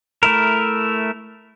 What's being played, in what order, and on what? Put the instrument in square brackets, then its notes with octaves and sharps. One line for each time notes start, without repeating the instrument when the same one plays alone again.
[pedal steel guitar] A3 E4 A#4